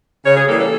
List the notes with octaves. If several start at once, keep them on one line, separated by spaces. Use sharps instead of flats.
C#3 C#5
G#4
E3 G3 A#3 A4
A4